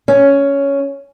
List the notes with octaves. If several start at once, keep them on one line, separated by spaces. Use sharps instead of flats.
C#4